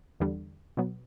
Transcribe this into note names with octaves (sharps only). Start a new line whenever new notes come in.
E2 D3 G3
B2 F#3 B3